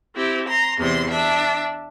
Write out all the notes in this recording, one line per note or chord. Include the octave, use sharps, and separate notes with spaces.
C4 E4 G4
A#5 C6
E2 C3 C6
D4 E5